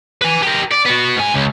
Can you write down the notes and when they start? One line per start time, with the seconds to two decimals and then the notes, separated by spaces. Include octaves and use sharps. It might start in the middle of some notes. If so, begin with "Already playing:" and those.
0.22 B4 G#5
0.43 G4 A#4
0.71 D5
0.86 B3 F#4
1.16 G#2 G#5
1.34 C#2